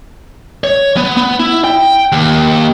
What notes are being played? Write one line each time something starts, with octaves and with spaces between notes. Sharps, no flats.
C#5
B3
B3
E4
G5
D#2